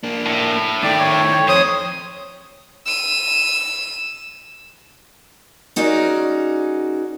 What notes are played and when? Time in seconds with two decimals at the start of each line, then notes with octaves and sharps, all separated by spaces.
0.03 A#3 D4
0.26 A2
0.83 D#3 A3 D5 G5
1.00 C#5
1.48 F2 C5 C#5 D#6
2.86 E6 D#7
5.76 C#4 D#4 F#4 G#4 A#4 D5